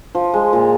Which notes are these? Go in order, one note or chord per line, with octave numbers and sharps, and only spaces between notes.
F3
G#3
A#2